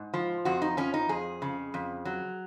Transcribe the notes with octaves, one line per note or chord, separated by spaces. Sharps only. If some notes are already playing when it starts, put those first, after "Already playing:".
Already playing: G#2
F3
F2 F#4
D#4
F3 C#4
D#4
F2 G#4
C#3
F2
F#3